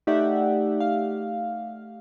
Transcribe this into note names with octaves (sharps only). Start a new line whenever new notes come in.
A3 D#4 G4 D5 E5 F#5
F5